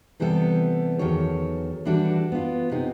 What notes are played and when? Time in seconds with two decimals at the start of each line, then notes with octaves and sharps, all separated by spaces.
0.20 C3 E3 G3 B3 A4
0.99 E2 C3 D#3 F#3 A4 C#5
1.85 E3 G3 D4 F#4 A4
2.32 B3 F4
2.71 C3 D#4